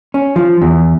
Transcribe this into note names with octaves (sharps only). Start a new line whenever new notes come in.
C#4
F3
E2